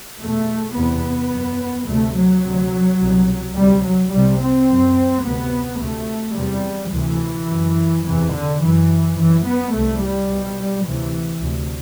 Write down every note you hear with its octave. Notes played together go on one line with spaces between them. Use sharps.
E2 B2 A3
E2 C3 B3
F#2
D2 C3 A3
F#3
D2 C3
C2 B2
D2 C3 G3
F#3
C2 C3 G3
C4
F#2
D2 C3 B3
D2 C3 A3
E2 C3 G3
D2 C3 E3
F#2
E2 C3 E3
D3
F#2 E3
F#2 E3
B3
C2 C3 A3
G3
C2 B2
D2 C3 E3
D2 C3